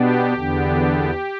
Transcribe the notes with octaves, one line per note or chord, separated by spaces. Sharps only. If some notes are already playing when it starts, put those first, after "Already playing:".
Already playing: B2 B3 D4 G4
E2 D3 B3 D4